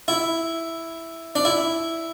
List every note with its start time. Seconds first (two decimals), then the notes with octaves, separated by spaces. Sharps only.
0.08 E4
1.36 D4
1.45 E4